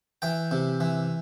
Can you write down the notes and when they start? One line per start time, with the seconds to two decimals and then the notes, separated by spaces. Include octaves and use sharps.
0.22 E3 G5
0.51 C3
0.80 E3